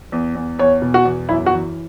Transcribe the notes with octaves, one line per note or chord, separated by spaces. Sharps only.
E2
E2
E2 C#5
B2
F#4
E2
F#2 E4
F#4
E3